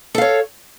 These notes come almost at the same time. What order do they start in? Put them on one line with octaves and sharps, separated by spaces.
A4 F5 C#5